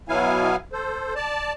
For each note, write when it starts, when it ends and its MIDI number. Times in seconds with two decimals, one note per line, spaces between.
0.09 0.56 47
0.09 0.56 54
0.09 0.56 59
0.09 0.56 64
0.09 0.56 77
0.09 0.56 80
0.73 1.14 69
0.73 1.14 72
1.15 1.53 74
1.15 1.53 81